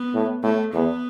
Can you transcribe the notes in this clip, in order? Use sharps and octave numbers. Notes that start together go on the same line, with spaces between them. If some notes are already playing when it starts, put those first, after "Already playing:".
Already playing: B3
A2
A2 A3
E2 B3